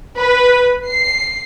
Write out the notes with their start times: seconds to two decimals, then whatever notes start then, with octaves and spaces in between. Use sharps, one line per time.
0.17 B4
0.88 C7